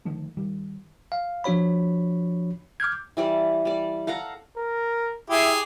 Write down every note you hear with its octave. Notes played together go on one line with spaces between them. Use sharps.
D3 D#3 F3 A3
D#3 G3
F5
F3 D4 F#4 C#5 B5
D6 F6 G6 G#6
E3 G3 D5
G3 D5
A4 F5 F#5 A#5
A#4
E4 G4 G#4